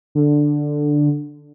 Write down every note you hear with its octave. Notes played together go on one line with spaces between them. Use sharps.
D3